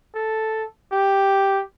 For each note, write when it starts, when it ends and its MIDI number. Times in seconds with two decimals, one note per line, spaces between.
0.15 0.65 69
0.92 1.61 67